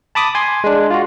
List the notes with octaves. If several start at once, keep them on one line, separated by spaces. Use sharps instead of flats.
A5 B5 D6 D#6
G#5 C6
G#3 D4
F4 F#4